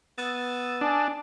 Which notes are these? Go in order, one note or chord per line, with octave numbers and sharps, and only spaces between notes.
B3 D#6 E6 A6
D4 G#5 A5